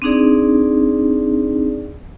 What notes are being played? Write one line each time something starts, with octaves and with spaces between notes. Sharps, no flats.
C4 D4 D#4 G#4 D5